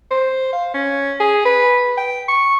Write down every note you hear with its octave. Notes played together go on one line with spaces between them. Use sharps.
C5
F5
C#4
G#4
B4
G5
C#6